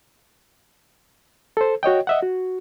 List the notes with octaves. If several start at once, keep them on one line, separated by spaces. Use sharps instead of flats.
A4 C5
F#4 C#5 D#5 G5
D#5 E5 F#5
F#4